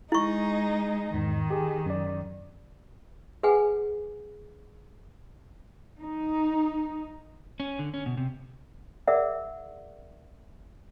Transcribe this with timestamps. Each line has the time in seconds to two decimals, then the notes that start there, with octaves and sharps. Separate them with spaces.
0.12 G#3 D#4 E4 C#6
1.14 E2 G#2 D#3
1.50 G4 G#4
1.86 F#2 D5
3.43 G#4 B4 F#5 G#5
6.01 D#4
7.60 C#4
7.79 D3
7.94 C#4
8.06 B2
8.17 C3
9.07 G#4 A#4 D5 E5 F#5